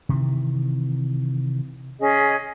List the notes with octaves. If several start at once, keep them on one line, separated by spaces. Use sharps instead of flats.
C3 D#3 E3
C#4 G#4 D#5